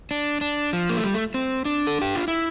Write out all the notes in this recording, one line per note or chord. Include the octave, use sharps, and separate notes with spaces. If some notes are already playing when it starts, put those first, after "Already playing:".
D4
D4
F3
A#3
A3
G3
A3
C4
D4
A4
G4
F4
E4